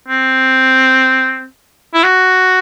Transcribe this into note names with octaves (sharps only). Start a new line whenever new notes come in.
C4
E4
F#4